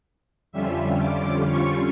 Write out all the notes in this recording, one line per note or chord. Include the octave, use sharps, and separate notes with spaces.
F2 D3 G3 C#4 F4 E5
D6
C#6